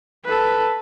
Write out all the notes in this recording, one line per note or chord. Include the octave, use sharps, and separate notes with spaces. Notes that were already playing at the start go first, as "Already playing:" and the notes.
A4 B4